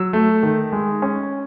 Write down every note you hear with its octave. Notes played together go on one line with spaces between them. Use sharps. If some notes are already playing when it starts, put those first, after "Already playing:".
Already playing: F#3 E6
A3
D#3
G#3
C#4